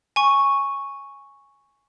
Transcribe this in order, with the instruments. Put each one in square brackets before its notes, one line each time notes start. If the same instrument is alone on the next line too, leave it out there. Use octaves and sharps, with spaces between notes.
[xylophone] G#5 C#6